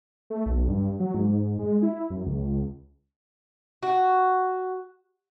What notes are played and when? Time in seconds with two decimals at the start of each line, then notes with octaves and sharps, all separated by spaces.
0.30 A3
0.46 B1
0.68 G2
1.00 F#3
1.14 G#2
1.59 G#3
1.82 E4
2.10 F#2
2.26 C#2
3.83 F#4